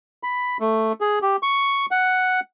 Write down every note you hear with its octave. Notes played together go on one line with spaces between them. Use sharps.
B5
A3
G#4
G4
C#6
F#5